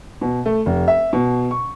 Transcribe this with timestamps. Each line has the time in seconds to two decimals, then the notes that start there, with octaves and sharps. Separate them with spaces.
0.21 B2
0.46 A3
0.66 F1
0.88 E5
1.13 B2
1.51 C#6